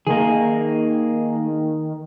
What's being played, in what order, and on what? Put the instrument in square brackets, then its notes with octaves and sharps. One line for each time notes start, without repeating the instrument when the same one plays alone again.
[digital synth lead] D#3 [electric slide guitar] A#3 G#4